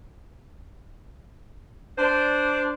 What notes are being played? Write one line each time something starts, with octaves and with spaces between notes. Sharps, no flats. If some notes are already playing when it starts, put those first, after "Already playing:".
D4 C5